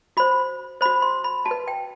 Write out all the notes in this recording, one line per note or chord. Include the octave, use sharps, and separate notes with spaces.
F#4 C5 B5
F#4 C5 B5
C6
B5
F#4 A5
B4
G5